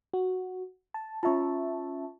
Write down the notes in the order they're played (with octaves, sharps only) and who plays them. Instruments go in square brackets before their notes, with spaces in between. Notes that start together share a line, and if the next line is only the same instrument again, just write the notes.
[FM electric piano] F#4
A5
[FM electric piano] C#4 E5 A5 [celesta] F4 C#6